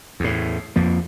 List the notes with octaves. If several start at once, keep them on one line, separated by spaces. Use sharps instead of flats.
E2 A2
F2 F3 A#3